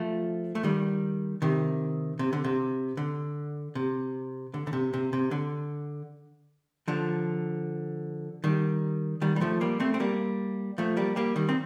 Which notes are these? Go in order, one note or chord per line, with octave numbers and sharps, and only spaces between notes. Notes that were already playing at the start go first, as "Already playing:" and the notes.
Already playing: F3 A3
A3
D#3 G3
C3 D#3
C3
D3
C3
D3
C3
D3
D3
C3
C3
C3
D3
D3 F3
D#3 G3
D#3 G3
G3
F3 A3
G3 A#3
A3 C4
C4
G3 A#3
F3 A3
G3 A#3
G3 A#3
D#3 G3
C4